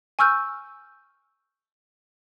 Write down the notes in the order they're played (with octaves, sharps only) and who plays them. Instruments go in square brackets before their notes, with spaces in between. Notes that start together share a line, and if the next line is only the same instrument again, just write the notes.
[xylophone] G#5 C#6 E6 F6 G6